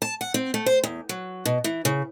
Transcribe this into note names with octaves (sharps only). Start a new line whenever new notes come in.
A5
F#5
C4
A3
C5
E2
F#3
B2
E3
C#3